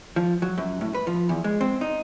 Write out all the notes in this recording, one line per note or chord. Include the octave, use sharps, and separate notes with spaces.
F3
F#3
F#2
A2
B4
F3
E2
G#3
C4
D#4